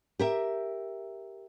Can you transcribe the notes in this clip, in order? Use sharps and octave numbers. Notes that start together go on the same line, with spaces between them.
G4 A#4 E5